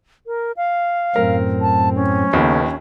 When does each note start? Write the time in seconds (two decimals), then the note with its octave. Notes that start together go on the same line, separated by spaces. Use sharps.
0.27 A#4
0.57 F5
1.16 F#2 A2 C4 A#4
1.61 A5
1.95 C#4
2.33 A#1 D#2 C#3 B3 A4